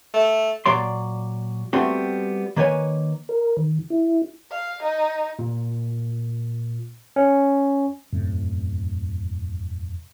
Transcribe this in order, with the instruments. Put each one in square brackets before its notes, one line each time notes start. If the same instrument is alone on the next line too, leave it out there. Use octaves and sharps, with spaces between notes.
[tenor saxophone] A3
[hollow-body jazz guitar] A#2 F#3 D5 C6
G3 A3 B3 C4 F#4
D#3 A#3 B4 C#5 F5 G#5
[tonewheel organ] A#4
D#3
E4
[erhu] F5
D#4
[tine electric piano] A#2
C#4
[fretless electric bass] E1 F#2 A2 C3